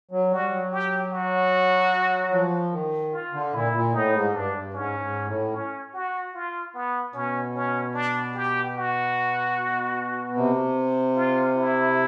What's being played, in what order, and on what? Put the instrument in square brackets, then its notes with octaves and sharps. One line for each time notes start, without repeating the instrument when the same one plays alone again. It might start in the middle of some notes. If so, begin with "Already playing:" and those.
[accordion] F#3
[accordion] G3 [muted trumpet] F#4
[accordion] F#3
[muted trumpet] G4
F#4
[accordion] F3
D#3
[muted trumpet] F4
[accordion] D3
[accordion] A#2 [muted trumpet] E4
[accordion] A#2
[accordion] A2 [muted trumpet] D#4
[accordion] G#2
[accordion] G2 [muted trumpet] D4
[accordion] G2
[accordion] G#2 [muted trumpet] C#4
[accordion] G#2
A2
[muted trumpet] C#4
F#4
F4
B3
[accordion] B2 [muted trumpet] C#4
[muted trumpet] C#4
D4
G4
F#4
[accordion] C3
[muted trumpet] F4
E4